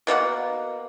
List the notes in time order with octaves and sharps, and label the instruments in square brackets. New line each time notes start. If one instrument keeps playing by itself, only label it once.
[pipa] B2 A#3 C#4 F#5